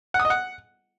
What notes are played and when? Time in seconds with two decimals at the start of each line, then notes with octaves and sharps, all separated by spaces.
0.14 F#5
0.20 D#6
0.25 D#5
0.30 F#5